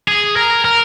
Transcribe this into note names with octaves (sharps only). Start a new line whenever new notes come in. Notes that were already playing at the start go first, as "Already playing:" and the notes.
G#4
A#4
A#4